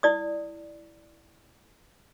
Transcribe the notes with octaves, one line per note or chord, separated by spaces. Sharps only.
E4 D5 D#6